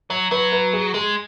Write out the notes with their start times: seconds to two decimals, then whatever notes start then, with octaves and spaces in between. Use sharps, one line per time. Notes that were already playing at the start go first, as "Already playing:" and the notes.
0.10 F#3 C#5
0.31 F#3 B4
0.52 B4
0.73 G#4
0.94 G#3 G#4